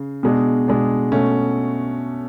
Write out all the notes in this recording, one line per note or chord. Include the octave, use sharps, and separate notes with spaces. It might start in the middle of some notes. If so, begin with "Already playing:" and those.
Already playing: C#3
B2 G#3 D4
B2 G#3 D4
B2 A3 C#4